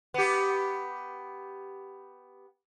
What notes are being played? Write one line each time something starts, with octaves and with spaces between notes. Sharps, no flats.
B3 G4